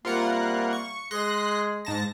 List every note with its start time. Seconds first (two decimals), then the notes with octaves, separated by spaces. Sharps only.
0.05 C3 G3 A#3 F4 A#4 F#5
0.73 C#6
1.11 G#3 G#4 C6 F#6 A#6
1.85 G#2 A5 A#6